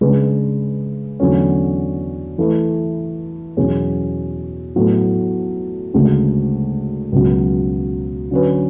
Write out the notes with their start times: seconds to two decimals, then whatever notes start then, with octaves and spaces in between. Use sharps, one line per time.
0.01 C#3 G#3 D4 G#4 B4
1.20 E2 D3 F#3 A3 C#4
2.38 E3 A3 E4 B4
3.57 E2 B2 F#3 C#4 G#4
4.76 A2 F#3 B3 F#4 A4
5.94 D2 C#3 G#3
7.12 C#2 B2 F#3
8.31 D3 F#3 C#4 F#4 B4